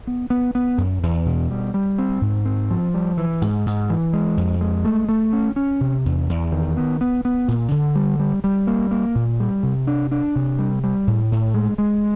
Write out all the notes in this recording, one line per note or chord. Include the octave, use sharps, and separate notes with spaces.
B3
B3
B3
F#2
E2
B2
G3
G3
C4
G#2
C4
F3
G3
E3
G#2
G#2
E3
G#3
F2
G#3
A3
A3
C#4
C#4
C3
E2
E2
D#3
B3
B3
B3
A#2
D3
G3
G3
G3
A#3
A#3
A#2
G3
C3
D4
D4
C3
G3
G3
A2
A2
G#3
G#3